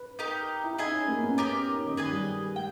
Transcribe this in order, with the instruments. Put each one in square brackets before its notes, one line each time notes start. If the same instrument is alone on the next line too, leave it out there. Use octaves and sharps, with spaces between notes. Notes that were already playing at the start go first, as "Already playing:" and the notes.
Already playing: [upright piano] B4
[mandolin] D#4 G4 A#4 D#5
[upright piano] E4
[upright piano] D#4 [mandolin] E4 G#4 D#5 G#5
[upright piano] C#4
A#3
B3
[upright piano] C#4 [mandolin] G4 A#4 D#5
[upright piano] D#4
C#4
D#3
[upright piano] D#3 [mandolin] G#4 B4 D#5 G#5
[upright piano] G3
[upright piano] G#3 [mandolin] G5